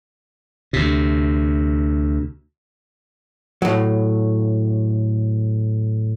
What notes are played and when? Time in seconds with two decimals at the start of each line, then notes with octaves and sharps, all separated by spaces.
0.73 D2 C3
3.62 A2 F#3